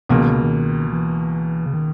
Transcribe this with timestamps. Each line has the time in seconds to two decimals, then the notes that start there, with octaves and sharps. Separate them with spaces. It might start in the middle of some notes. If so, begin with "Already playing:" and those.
0.09 C#2 B2 E3 A#3
0.20 D#3
0.31 C#3
0.43 D#3
0.92 E3
1.66 C#3
1.74 D#3